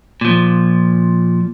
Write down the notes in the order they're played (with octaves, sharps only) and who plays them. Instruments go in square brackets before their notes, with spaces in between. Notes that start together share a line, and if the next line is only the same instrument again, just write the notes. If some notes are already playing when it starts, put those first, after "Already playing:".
[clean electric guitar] A#2 F3